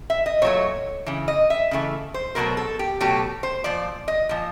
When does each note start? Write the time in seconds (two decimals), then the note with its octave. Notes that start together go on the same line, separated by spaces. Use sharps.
0.10 E5
0.26 D#5
0.42 A#2 F#3 A3 C#5
1.06 C#3 E3
1.28 D#5
1.50 E5
1.71 C#3 E3 A3
2.14 C5
2.35 B2 F#3 A3 A#4
2.57 A4
2.79 G4
3.01 B2 F#3 A3 G4
3.43 C5
3.64 A#2 F3 D5
4.08 D#5
4.29 A#2 F3